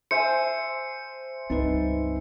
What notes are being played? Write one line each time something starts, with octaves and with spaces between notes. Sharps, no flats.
C5 E5 G#5 C#7
C#2 G2 C4 D#4 B4